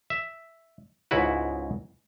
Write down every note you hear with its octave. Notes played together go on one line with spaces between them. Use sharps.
E5
C#2 G#2 C#3 E4 F#4 B4